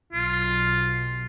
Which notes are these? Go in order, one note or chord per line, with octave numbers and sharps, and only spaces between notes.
B1 F4